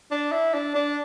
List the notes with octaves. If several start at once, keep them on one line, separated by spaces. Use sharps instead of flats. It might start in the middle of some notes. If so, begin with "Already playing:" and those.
D4
E4
D4
D4